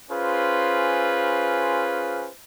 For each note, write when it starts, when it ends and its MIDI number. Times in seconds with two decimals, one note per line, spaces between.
0.10 2.29 61
0.10 2.29 65
0.10 2.29 68
0.10 2.29 71
0.10 2.29 72